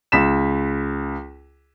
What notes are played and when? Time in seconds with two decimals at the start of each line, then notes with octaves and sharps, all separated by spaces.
0.12 C#2 B6 E7